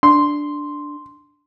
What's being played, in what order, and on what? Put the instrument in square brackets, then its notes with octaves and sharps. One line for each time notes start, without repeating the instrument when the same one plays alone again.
[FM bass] D4 [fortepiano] C6